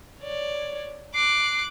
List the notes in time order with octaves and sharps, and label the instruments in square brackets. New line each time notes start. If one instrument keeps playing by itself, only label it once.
[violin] C#5 D5
[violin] D6 F#6 [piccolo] C7